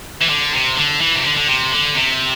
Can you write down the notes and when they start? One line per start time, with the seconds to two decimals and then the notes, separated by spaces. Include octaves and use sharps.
0.21 E3
0.29 D3
0.53 C3
0.77 D3
1.01 E3
1.15 C3
1.25 D3
1.37 D3
1.47 C3
1.72 D3
1.95 C3